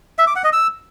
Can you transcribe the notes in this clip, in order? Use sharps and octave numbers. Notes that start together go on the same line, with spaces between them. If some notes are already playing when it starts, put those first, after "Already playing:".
E5
D6
F#5
D#5
E6